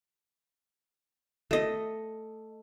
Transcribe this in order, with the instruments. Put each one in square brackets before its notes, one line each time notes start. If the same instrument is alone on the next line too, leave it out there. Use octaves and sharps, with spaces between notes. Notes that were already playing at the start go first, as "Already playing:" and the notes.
[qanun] A3 D#5